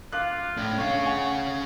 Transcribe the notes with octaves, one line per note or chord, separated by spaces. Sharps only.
F4 F5 D6 F#6
A2 D4
C#4 C#5 F5
F#5 G#5 C#6